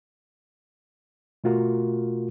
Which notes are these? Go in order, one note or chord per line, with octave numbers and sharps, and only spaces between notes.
B2 A3 F4 F#4 A#4